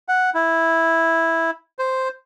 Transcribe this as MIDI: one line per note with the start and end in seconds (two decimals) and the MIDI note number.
0.08 0.30 78
0.34 1.51 64
1.79 2.08 72